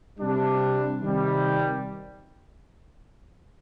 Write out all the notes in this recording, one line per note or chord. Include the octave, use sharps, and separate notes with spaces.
C3 G3 D4
C3 D#3 G3